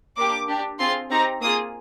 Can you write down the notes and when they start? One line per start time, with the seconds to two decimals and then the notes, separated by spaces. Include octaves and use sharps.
0.17 A#3 D4 G4 D6
0.48 D4 G4
0.79 C4 F4 G#4 C6
1.10 C4 D#4 G4 A#5
1.41 A#3 F4 G#4 D#6